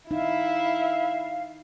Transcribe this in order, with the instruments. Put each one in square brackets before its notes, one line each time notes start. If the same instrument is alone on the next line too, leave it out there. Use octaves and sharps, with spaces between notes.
[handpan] D#4 [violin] E4 E5 [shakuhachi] F5